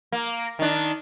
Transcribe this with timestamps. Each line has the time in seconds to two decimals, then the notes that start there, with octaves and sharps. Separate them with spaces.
0.12 A#3
0.59 D#3 D4